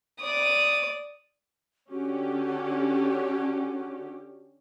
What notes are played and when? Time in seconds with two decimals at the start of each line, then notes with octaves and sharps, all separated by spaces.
0.20 D5 D#6
1.91 D3 C#4 F#4 G4